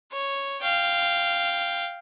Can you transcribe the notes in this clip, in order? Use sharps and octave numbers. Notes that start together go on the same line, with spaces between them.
C#5
F5 G5